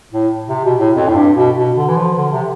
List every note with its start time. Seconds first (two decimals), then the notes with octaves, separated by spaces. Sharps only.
0.12 A2
0.49 C3
0.64 B2
0.79 A2
0.95 F2
1.08 A2
1.15 G2
1.35 B2
1.56 B2
1.77 D3
1.89 E3
1.97 F3
2.17 D3
2.32 C3